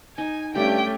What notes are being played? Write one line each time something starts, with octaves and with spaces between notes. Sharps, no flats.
D#4 G#5
G2 A3 C#4 G4 D5 G5